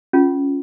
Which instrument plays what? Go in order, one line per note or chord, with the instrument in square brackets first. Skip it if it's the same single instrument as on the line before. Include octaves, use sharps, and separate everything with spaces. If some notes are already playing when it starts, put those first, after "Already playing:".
[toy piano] C#4 F4 G#4